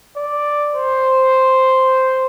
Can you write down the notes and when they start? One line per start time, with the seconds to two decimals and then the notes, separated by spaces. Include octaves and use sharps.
0.17 D5
0.74 C5